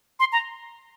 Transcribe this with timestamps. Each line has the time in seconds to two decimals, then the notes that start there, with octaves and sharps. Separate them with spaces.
0.20 C6
0.32 A#5